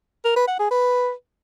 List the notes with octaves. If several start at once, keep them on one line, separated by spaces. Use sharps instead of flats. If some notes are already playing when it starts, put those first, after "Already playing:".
A#4
B4
F#5
G#4
B4